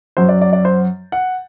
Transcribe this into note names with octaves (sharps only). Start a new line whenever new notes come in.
F#2 F#3 C5
D5
D5
D5
C5
F#5